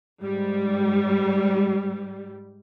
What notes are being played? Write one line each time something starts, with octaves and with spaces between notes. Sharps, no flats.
G#2 G3